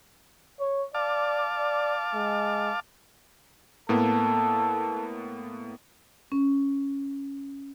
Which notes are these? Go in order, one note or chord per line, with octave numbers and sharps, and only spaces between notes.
C#5
D5 F5 A5 D6
D5
G#3
A2 A#3 B3 A4
C#4